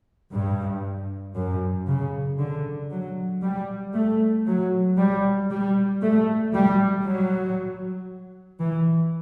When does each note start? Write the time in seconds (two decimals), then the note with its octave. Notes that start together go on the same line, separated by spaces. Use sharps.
0.32 G2
1.36 F#2
1.87 C#3
2.39 D3
2.91 F#3
3.43 G3
3.94 A3
4.46 F#3
4.98 G3
5.50 G3
6.01 A3
6.53 G3
7.05 F#3
8.60 E3